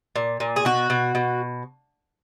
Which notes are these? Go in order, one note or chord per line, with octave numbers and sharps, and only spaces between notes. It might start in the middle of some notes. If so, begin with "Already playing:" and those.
A#2
A#2
G#4
B2 F#4
B2
B2